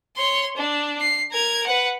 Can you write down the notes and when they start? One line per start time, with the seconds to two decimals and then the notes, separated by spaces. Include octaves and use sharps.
0.17 C#5 C6
0.56 D4
1.01 C7
1.32 A#4 G#6
1.66 B4 F#5